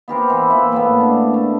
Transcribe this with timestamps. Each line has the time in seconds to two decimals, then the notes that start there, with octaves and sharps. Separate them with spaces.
0.08 B3 G4 A#4 C5
0.30 E3
0.50 A#3 B4 E5
0.72 A2 A#3 B3
1.00 D4
1.34 A3